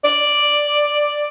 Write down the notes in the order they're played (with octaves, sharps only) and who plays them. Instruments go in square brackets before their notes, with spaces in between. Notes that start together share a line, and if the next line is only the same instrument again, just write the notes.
[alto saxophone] D5